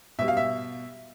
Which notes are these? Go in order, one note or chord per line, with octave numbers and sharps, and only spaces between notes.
B2 G3 E5
F5
E5